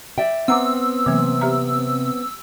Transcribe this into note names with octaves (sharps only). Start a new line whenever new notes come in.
D5 E5 G5
B3 C4 F#5 A#5 D6 E6
C3 E3 F#3 A#3
G4 E5 A#5